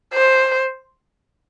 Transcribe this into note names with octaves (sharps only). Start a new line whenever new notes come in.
C5